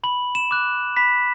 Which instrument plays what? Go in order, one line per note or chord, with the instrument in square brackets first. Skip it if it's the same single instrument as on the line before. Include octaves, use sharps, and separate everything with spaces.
[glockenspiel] B5 F#7
E7
D6 F#6
B5 B6